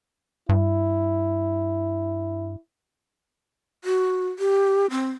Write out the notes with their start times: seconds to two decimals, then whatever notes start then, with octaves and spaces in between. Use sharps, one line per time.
0.49 G2 E4
3.84 F#4
4.39 G4
4.90 C4